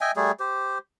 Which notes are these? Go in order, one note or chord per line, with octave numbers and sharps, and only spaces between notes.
D#5 E5 G5 G#5
G3 A3 G#4
G4 C5